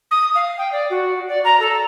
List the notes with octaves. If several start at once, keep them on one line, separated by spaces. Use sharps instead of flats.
D#6
F5
G5
D5
F#4
D5
A#5
A4